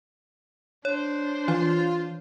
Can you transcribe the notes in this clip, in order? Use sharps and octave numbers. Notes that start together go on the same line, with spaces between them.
D4 C5 C#5
E3 F4